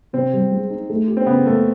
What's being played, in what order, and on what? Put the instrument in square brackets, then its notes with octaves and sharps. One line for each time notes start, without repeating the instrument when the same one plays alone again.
[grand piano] C3 [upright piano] C4
[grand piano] G3
G#3
D#4
A3
G4
[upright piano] C4
[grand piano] C#3 [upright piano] B3
[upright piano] A3 [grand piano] A#3